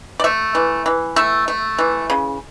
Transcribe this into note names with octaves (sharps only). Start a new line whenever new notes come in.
D5
A3 E5
E3
E3
A3 E5
A3
E3
C#3